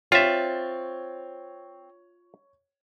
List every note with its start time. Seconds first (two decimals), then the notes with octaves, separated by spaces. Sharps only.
0.12 C4 F4 C#5 E5 A6